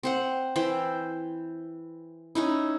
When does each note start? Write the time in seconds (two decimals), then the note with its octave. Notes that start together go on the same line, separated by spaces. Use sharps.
0.03 C4 C5 F#5
0.56 E3 C5 G5
2.35 C#4 D#4 E4